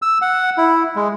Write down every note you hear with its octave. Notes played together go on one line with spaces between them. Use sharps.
E6
F#5
E4
G#3